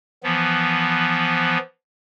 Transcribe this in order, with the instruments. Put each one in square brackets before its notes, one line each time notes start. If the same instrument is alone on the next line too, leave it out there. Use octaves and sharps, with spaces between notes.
[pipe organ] E3 F3 B3